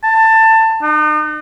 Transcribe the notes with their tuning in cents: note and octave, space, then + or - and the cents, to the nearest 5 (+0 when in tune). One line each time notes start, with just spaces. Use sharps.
A5 +20
D#4 -45